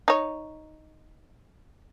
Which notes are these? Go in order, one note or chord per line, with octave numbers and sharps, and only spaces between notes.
D#4 C#5